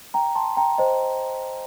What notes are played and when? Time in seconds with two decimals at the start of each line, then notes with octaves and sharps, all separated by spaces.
0.14 G5 A#5
0.35 A5 C6
0.57 G5 A#5
0.78 C5 D#5